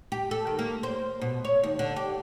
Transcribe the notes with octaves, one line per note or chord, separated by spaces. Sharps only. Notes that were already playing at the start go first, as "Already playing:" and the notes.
G4
A4
D#3
A#3
C5
B2
C#5
D#2
D3
G4